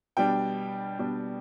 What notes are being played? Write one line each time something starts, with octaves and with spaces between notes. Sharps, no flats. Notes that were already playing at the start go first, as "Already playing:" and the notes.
B2 G3 D4 G5
B2 G3 D4